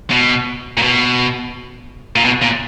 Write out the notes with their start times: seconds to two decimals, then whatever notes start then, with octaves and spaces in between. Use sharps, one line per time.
0.11 B2
0.77 A#2
0.82 B2
2.16 A#2
2.24 B2
2.42 A#2